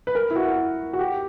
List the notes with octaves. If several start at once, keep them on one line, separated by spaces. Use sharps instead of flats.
B4
A#4
E4
F#4
F#4
G4